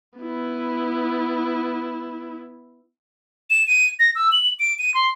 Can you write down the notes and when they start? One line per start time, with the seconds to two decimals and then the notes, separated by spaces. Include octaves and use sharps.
0.19 B3 E4
3.50 E7
3.67 D#7
3.99 A#6
4.16 E6
4.32 F#7
4.60 D7
4.79 D#7
4.94 C6